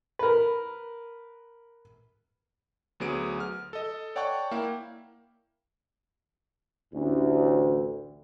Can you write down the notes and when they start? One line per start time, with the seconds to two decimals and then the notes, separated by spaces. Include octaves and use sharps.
0.19 A#4 B4
3.00 D2 F#3 B3 G#4 D7
3.40 F6
3.73 A4 D#5
4.16 C#5 D5 F#5 G5 A5 C#6
4.51 A#3 E4 F5 G5
6.93 A1 D2